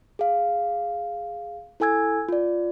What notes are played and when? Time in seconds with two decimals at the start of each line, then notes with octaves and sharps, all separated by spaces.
0.19 G#4 F5
1.80 E4 A4 G#5 E6 G#6
2.29 F4 D5